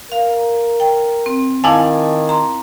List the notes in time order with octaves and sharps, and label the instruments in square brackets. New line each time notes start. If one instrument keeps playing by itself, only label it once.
[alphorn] A#4 [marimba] F5
[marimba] G5
C4
[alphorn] D#3 [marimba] E4 F5 [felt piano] G#5 A5 D6
[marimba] A#5 C6